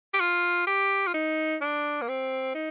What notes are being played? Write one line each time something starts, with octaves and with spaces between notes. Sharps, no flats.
G4
F4
G4
F4
D#4
D4
A#3
C4
D#4